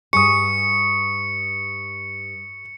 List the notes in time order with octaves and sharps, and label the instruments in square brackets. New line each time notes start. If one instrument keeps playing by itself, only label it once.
[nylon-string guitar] G2 G3 G#4 [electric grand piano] C#6 D#6 [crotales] C#7